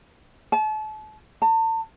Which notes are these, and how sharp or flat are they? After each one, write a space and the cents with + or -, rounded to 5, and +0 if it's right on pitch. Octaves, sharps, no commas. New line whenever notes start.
A5 -35
A5 +40